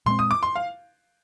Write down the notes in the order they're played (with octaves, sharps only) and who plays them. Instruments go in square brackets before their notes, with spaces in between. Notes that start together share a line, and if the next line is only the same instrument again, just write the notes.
[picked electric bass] A#2 G#3 C4 [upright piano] C6
[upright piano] D#6
D6
C6
F5